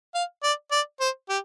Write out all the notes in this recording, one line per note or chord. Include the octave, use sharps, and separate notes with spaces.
F5
D5
D5
C5
G4